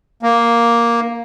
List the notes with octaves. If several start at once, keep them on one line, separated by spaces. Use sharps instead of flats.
A#3